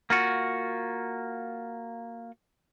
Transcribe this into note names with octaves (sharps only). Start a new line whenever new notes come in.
A#3 F4 F#4